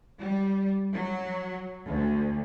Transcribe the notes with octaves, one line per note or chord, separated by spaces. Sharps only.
G3
F#3
D2